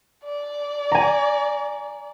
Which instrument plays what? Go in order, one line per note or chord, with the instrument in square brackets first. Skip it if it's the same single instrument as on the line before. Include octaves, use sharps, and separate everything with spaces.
[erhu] D5
[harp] G#5 A#5